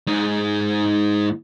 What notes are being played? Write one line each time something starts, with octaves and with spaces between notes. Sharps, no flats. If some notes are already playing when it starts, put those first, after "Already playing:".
G#2 G#4